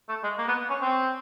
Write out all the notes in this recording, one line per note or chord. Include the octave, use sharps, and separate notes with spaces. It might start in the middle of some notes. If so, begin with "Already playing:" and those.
A3
G#3
A#3
B3
C#4
C4